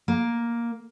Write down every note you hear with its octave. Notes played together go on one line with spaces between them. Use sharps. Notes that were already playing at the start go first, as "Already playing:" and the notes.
A#3